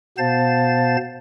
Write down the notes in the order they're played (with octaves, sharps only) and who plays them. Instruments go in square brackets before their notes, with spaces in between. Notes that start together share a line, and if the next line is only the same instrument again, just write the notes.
[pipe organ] B2 B3 C5 F5 A5 A6